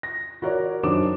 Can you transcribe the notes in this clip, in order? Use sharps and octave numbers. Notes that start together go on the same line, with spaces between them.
A#6
F#4 A#4 C#5 D5
F#2 D#3 D4 C5 D6 E7